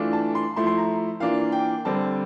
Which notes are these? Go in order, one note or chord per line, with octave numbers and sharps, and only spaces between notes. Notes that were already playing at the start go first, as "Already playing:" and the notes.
Already playing: E3 A3 D4 F4
A5
C6
F3 A3 E4 C6
C6
A#5
E3 A#3 D4 F4 F5
G5
D3 G3 C4 A5